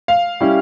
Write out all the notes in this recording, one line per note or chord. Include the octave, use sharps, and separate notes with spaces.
F5
G3 C#4 E4